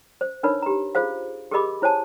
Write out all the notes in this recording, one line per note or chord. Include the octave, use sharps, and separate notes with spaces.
C5
D4 D#4 A#4 B4 C#5 B5
G4 A#5
F4 G#4 C5 F5
G4 G#4 A#4 D#5 B5 D6
E4 C5 C#5 G#5 A5